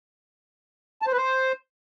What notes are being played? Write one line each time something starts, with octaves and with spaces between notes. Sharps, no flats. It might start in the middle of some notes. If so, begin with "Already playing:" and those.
A5
C5
B4
C5